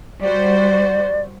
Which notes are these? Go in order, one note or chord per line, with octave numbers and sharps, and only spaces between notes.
G3 F#4 C5 D5